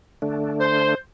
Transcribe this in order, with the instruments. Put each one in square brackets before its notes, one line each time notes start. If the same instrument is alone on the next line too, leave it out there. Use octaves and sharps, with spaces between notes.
[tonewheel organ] D3 A3 D4
[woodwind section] C5